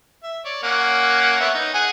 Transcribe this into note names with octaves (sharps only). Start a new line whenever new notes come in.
E5
C#5 D5
A#3 C#4 F#5
B3 C#5 E5
D#4
G#4 F#5 G#5